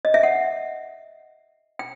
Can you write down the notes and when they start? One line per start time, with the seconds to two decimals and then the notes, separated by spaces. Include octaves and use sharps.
0.05 D#5
0.14 E5
0.23 F#5
1.79 G5